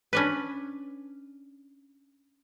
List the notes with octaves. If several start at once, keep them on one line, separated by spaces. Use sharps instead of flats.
C#4 D4 B4